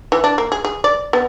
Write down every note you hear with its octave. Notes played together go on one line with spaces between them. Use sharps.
E3
D4
A#3
G#4
G#4
D5
B3